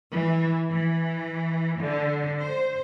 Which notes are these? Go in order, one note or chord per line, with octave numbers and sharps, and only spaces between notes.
E3
E3
D3
C5